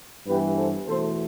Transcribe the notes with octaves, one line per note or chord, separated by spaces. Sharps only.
G2 E3 B3 G4 B4
A4 C5
E2 B2 A3 A4 C5